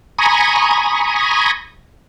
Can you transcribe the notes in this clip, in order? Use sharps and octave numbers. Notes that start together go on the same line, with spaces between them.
G#5 A#5 B5 C#6 D#6